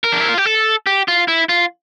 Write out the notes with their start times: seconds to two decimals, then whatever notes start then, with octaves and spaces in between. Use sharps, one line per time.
0.04 A#4
0.12 D4
0.21 E4
0.28 F4
0.38 G4
0.46 A4
0.87 G4
1.08 F4
1.28 E4
1.49 F4